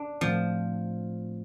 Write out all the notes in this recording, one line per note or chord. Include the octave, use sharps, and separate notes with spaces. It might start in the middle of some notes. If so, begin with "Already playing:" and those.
Already playing: D4
A2 F3 A3 C4